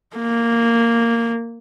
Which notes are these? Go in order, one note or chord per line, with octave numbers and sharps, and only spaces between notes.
A#3